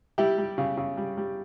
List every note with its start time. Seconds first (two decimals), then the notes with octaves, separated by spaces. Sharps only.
0.18 G3 E4 G4
0.38 G3
0.58 C#3
0.77 C#3
0.97 G3
1.17 G3